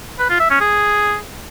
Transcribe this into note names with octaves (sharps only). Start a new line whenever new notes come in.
B4
F4
E5
C#4
G#4